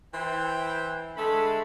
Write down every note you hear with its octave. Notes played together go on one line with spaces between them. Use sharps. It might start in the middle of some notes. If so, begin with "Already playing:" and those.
E3 E4 C5 G5
D3 G#3 A3 B5